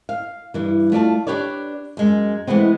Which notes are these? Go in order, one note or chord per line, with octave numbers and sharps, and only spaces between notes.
F5
G2 E3
A3 F4 D5 A5
D4 G4 B4 C#5 D5
F#2 G#3
E3 G#3 A3 B3 C4